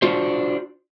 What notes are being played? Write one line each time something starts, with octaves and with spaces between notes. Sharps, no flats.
D4 F4 F#4 C5